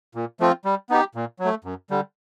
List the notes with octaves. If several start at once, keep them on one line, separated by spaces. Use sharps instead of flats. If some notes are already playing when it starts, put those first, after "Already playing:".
A#2
F3 A3 C4 F4
G3
B3 D#4 G4
A#2
F#3
A3
F#2
D3 G3